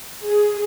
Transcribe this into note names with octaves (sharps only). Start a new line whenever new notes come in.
G#4